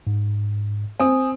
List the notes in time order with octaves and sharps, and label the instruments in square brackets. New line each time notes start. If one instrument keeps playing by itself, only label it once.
[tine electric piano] G#2
[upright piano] C4 [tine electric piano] G#5 D#6